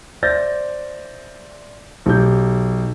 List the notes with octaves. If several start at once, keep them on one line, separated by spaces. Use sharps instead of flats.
C5 D5 E5 G6 A6 A#6
B1 G4 G6